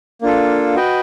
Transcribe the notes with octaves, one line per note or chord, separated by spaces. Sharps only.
A#3 D4 F4 A4
F#4 B4 D#5 G5